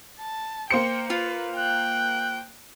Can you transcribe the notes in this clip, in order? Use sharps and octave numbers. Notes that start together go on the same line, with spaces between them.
A5
A#3 C5 G5 C#7
F4 B4
G5 F#6